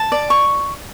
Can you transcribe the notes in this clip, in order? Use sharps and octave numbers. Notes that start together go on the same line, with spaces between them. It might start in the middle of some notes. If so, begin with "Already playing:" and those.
Already playing: A5
D5
C#6